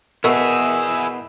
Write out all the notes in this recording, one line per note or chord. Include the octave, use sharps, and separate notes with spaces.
B2 E4 F#4 G#4 A#4 E5